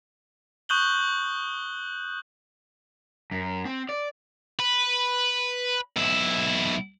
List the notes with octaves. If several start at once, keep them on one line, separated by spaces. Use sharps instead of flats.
C#6 D#6 F#6 G6 F#7 G7
F#2
C4
D5
B4
B1 E4